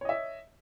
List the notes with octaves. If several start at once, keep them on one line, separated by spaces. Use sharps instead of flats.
C#5 D#5 E5